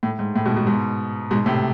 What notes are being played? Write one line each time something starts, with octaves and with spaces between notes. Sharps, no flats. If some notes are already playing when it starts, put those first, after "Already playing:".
A2
G#2
A2
G#2 B2
G#2 B2
G#2 B2
G#2 B2
A2 C3